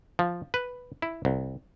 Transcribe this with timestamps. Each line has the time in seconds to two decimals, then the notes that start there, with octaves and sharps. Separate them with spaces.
0.19 F3
0.54 B4
1.02 E4
1.25 C2